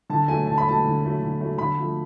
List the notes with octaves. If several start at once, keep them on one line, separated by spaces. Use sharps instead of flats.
D3 A5
F#3 A3 G#5
D3 A5
B5
F#3 A3 A5
D3
F#3 A3
D3
F#3 A3
D3 B5
F3 A3